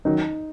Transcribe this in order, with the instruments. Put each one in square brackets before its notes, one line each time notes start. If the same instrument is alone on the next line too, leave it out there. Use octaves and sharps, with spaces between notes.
[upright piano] D#3 F#3 [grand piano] D#4